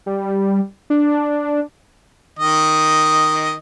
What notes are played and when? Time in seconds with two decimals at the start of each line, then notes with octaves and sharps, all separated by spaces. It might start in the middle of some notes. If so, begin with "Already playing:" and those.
0.06 G3
0.90 D4
2.39 D#3 D#5